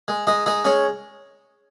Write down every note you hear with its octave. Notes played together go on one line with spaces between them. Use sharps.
G#3
G#3 D#4 D#5
G#3 D#4 D#5
G#3 C#4 C#5